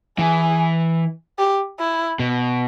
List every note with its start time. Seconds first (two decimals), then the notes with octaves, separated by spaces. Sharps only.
0.18 E3 G#4
1.39 G4
1.79 E4
2.19 B2